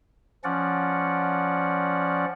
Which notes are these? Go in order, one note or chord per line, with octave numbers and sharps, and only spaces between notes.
F3 C#4 D5 F#5